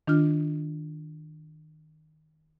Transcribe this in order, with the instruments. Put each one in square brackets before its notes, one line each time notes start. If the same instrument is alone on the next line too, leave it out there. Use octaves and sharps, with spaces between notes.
[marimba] D#3 D4 F4 F6